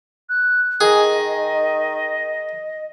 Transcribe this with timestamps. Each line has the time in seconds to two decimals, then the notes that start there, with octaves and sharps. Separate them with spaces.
0.29 F#6
0.81 D#3 G#4 D#5